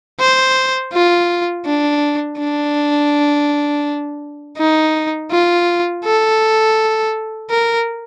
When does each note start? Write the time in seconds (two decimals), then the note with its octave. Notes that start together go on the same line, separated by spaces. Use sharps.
0.20 C5
0.93 F4
1.66 D4
2.39 D4
4.58 D#4
5.31 F4
6.05 A4
7.51 A#4